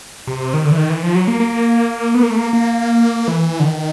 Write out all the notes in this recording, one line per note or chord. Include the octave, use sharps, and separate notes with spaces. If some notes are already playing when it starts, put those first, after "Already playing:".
C3
D#3
D3
E3
D#3
E3
F3
F#3
A#3
A#3
B3
A#3
A3
A#3
A#3
E3
D3
D#3